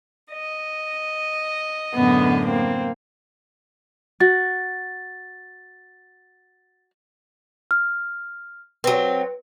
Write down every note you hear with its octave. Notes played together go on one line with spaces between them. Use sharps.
D#5
F#2 A2 D3 B3
A#3 C4
F#4 A6
F6
F#3 C4 B4